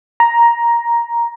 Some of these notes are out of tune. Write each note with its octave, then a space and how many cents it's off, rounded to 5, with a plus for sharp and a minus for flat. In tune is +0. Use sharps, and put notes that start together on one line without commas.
A#5 +5